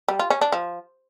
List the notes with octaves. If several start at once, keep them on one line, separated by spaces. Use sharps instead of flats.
G3
F4
C#4
D4
F3